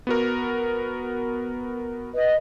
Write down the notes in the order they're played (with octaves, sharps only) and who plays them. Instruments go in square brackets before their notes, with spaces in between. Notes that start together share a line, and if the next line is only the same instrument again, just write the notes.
[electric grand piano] B3 F#4 A#4
[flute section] B4 D#5